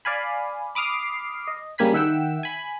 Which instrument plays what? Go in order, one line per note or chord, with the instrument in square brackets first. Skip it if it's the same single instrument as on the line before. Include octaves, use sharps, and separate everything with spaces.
[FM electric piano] D5 F5 G#5 B5
B5 D6 D#6 F6 C7
D#5
C#3 G3 A#3 G#5 B5 B6
D#3 E5 F#5 G5 E6
G#5 B5